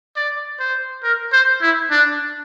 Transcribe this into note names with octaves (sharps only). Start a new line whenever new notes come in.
D5
C5
A#4
C5
E4
D4